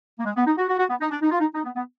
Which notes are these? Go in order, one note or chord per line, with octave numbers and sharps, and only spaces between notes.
A#3
G#3
B3
D#4
F#4
F#4
F#4
B3
D#4
D4
D#4
F4
D#4
D#4
B3
B3